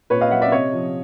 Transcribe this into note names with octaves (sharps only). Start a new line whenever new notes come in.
A#2 B4 C#5
D#5 F5
F#3 E5 F#5
D5 E5
C3 C#5 D#5
F3